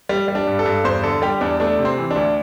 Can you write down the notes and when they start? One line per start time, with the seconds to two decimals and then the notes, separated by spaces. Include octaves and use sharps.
0.09 G3
0.28 G3
0.35 D4
0.47 G2
0.59 A4
0.66 G2
0.84 E2 C5
1.03 D3 A4
1.22 G3 G4
1.41 E2 D4
1.60 A3 D4
1.79 C3
1.85 C4
1.98 E3
2.11 D4
2.16 D2